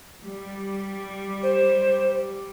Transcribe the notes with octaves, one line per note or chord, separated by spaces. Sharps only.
G3
C5